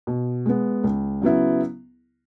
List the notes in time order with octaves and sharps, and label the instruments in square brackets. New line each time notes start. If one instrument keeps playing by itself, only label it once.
[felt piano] B2
G#3 B3
C#2
C#3 F#3 B3 E4